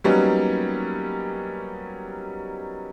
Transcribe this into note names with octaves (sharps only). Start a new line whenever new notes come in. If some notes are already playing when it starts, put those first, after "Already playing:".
F#3 G3 A#3 B3 C#4 D#4